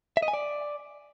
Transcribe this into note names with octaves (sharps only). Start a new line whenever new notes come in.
E5
D#5
G#5
D5